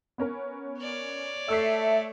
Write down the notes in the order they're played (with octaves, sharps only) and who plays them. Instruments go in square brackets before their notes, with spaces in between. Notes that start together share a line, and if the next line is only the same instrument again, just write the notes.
[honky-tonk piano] B3 C#4 A#4
[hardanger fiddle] C#5 D5
[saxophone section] A3 [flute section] E5 [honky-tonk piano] E6 C7